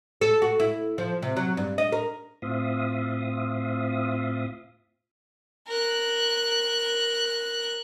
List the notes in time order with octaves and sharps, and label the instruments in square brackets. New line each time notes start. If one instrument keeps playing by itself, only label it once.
[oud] A4
F#4
E4
F3
C3
F#3
G2
D#5
A#4
[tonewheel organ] A2 C4 F4 E5 F5 D#6
[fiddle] A#4 F#6